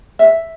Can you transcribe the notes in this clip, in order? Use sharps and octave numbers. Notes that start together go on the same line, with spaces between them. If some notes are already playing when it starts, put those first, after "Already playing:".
E5